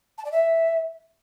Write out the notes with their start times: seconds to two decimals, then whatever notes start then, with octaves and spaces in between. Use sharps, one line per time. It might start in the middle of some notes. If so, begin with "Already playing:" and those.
0.18 A5
0.25 D5
0.32 E5